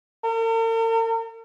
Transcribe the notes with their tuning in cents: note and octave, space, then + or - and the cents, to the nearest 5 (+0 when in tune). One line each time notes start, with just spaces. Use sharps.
A#4 -45